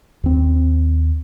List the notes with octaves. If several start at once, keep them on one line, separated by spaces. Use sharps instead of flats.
D#2 C4